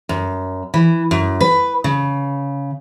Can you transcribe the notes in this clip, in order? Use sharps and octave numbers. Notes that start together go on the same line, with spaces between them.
F#2
E3
F#2
B4
C#3